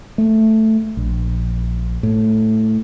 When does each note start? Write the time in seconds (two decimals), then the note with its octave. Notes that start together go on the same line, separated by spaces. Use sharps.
0.18 A3
0.97 A#1
2.03 A2